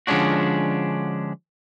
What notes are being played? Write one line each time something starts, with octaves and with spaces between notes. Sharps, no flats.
D3 F3 G#3 C#4 D4 F#4